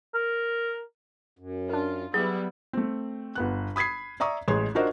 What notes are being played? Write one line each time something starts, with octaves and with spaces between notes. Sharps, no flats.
A#4
F#2
D4 F4 A#4
F#3 G3 B3 E4 G#4
A3 C4
G1 B3 F#6
B5 D#6 G#6 B6 C7
D5 E5 A#5 C#6 D#6
A1 G#3 G#4 C#5 C6 G#6
D4 F4 F#4 A#4 C5 D#5